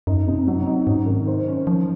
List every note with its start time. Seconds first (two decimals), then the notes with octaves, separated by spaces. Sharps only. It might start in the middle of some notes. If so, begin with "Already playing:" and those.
0.07 F#2 D#4
0.28 C3
0.47 F#3
0.67 D#4
0.87 G#2 C#4
1.06 D#3
1.27 C5
1.48 C#4
1.67 F3 C#4